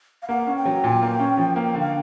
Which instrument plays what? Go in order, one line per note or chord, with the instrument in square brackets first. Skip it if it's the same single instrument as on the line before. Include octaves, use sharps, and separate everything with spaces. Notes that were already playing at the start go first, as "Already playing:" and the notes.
[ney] F5
[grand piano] A#3 [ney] F#5
[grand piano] C#4
[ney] G5
[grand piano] F#3
A#2
A#3
C#4
F3
A#3
D3
[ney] F5